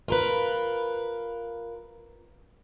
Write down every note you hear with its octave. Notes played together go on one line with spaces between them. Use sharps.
F4 A#4 B4